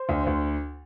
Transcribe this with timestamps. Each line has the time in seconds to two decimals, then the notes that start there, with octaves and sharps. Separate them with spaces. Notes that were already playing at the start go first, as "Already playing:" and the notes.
Already playing: C5
0.09 D2
0.27 D2